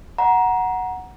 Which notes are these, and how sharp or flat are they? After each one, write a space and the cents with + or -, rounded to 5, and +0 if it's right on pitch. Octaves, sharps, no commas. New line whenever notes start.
F#5 +0 A#5 +20